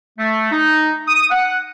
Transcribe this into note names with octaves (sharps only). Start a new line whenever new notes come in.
A3
D#4
D#6
F#5